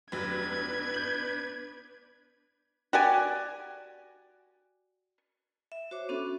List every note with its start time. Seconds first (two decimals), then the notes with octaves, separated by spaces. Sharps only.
0.12 F1 F#3 B3 D4 B4 G#6
0.94 G6 F#7
2.93 F#4 G4 D5 G#5
5.72 E5
5.91 F#4 C5 C#5 D6
6.09 B3 C#4 D4 F#4 A4